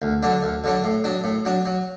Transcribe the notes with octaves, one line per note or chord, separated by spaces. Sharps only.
D2
D3 F#3 D4
D2
D3 F#3 D4
A2
F#3 D4
A2
F#3 D4
F#3